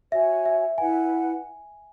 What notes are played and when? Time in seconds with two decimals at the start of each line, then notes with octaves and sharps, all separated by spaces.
0.12 F#4 C#5 E5 G#5
0.45 E5
0.78 E4 B4 F#5 G#5